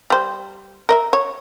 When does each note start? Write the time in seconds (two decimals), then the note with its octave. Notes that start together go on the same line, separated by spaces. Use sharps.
0.10 G3 C5
0.89 A#4 D#5 E5
1.13 C#5